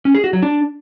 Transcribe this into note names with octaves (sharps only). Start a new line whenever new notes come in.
C#4
G#4
F#4
F#3
D4